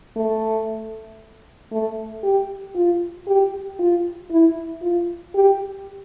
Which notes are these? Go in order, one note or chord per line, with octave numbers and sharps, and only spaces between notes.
A3
A3
G4
F4
G4
F4
E4
F4
G4